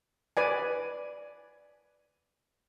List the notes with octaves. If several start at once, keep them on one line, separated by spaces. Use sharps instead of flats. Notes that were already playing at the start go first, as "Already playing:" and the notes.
B4 D5 G#5